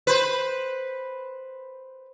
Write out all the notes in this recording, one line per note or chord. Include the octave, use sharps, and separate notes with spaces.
B4 C5